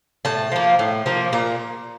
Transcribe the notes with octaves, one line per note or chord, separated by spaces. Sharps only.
A2 A5
F3 A#3
A2
F3 A#3
A#2 A#5